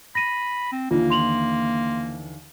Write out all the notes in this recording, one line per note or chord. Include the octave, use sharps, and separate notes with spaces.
B5 A#6 D#7
C4
D#2 D3 E3 A#3 F4
C6 F7 F#7